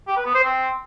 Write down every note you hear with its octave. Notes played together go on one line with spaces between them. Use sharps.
G4
B4
B3
C5
C4